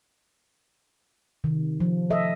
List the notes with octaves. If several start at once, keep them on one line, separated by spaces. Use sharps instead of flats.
C3 D#3
F3
A4 D#5 E5